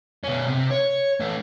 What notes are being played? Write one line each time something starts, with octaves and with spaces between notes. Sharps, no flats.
B2 C#4
C3
C#5
A3 C#4